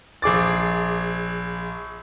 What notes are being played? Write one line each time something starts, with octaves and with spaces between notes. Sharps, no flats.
A#1 G#4 D6 A6